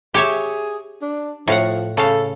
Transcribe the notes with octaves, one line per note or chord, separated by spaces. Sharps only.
G4 G#4 C#5 E5
D4
A2 F3 F5 F#5
C#3 A4 F5